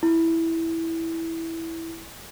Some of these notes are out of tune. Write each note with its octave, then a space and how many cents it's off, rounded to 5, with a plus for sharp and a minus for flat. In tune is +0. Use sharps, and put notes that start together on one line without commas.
E4 -5